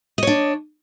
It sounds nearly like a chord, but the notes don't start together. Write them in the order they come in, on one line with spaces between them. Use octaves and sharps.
D#5 C#5 D4